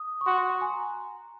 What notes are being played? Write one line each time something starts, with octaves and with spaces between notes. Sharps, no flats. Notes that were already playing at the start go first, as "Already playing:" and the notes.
Already playing: D#6
C#6
F#4 C6
C6
C6
G#5
A#5